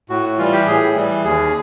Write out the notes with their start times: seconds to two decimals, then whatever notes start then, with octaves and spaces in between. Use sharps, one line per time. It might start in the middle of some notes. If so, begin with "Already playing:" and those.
0.10 A2 F#4
0.38 E3 G3 F4
0.53 G4
0.67 A2 G#4
0.95 E3 G3
1.24 D#2 G#4